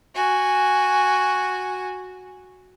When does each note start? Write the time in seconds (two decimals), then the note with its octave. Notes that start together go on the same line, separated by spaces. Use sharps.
0.15 F#4 G#5